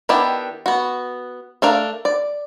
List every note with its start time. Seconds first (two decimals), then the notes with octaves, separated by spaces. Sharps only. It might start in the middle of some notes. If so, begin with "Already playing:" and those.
0.09 D#3 B3 D4 E4 G4
0.66 B3 F#4
1.62 A3 D4 A#4 F5
2.05 D5